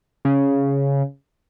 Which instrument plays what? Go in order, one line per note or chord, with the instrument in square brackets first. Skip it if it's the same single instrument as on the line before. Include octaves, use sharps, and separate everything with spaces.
[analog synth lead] C#3